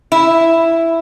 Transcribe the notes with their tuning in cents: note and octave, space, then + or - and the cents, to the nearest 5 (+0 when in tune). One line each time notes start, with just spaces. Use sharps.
E4 +5